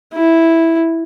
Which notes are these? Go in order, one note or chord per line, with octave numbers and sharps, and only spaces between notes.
E4